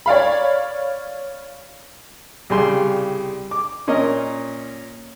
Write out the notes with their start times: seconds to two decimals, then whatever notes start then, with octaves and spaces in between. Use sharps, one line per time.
0.06 C#5 D5 F5 B5
2.50 C2 C#3 G3 G#5 C6
3.51 D6
3.87 A#2 C#4 A#4 D#5